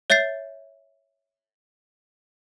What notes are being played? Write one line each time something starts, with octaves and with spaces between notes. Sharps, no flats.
C#5 E5 G6 A6 C7